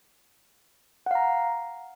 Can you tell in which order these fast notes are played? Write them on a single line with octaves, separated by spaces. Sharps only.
F#5 F5 A#5